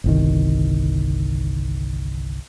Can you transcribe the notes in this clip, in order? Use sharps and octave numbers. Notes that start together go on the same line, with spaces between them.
G1 C2 D#3